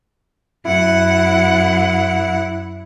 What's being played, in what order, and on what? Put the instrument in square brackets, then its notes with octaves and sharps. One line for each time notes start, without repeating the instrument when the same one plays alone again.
[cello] F#2 F#5 [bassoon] E4